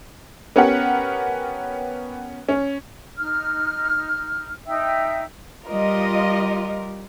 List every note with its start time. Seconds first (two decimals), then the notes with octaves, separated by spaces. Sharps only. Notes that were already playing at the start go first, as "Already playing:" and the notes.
0.56 B3 C#4 G4 A#4 F#5
2.49 C#4
3.17 D#4 F6
4.67 D#4 E5 G5 E6
5.68 G3 F4 A#4 D#5